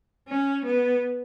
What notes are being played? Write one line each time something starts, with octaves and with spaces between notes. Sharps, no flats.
C#4
B3